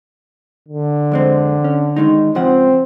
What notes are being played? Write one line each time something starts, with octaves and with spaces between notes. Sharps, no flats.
D3
F2 G#3 C4
C#4
D#3 G#3 D#4
C#2 F3 C4 F#5